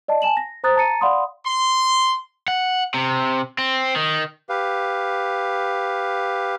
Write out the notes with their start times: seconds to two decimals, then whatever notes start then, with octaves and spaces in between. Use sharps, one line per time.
0.08 D5 D#5 A5
0.22 G#5 A5 E7 F#7
0.37 A#6
0.64 C5 A#5 D#6 F#6 A6
0.76 A5 A#5 A6 C#7 D#7
1.01 D5 F5 F#5 B5 C6 D#6
1.44 C6
2.48 F#5
2.94 C3
3.58 C4
3.96 D#3
4.49 G4 B4 F5